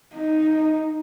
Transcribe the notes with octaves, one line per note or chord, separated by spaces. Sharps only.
D#4